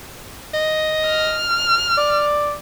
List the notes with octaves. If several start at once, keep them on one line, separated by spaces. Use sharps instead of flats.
D#5
F6
D5